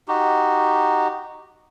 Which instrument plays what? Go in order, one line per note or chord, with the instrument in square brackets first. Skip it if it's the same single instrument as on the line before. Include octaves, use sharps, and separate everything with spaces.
[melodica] D#4 F#4 G4